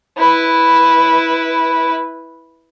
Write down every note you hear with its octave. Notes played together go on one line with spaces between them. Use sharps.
E4 B4